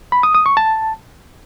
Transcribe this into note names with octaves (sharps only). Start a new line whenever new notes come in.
B5
D#6
D#6
C#6
A5